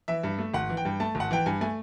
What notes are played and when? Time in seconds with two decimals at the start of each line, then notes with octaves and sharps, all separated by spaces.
0.08 E3 E5
0.24 G2
0.38 A3
0.54 G#1 F#5
0.70 E3
0.77 G5
0.85 G2
1.00 A3 A5
1.15 G#1
1.20 F#5
1.31 E3 G5
1.46 G2 G#5
1.61 A3 G#5